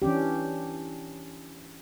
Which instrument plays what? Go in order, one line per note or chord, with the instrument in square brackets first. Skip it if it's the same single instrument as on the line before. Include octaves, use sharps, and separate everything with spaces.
[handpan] E3 C#4 D4 G4